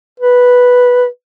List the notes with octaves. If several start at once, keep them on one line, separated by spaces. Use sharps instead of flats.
B4